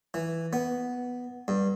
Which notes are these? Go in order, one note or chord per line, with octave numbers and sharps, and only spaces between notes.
E3
B3
G2